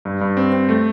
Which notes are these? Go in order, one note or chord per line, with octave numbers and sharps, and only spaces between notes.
G2
G2
C4
C4
A3